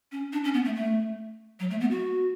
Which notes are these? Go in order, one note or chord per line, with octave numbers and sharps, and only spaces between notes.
C#4
D4
C#4
B3
A3
A3
F#3
A3
B3
F#4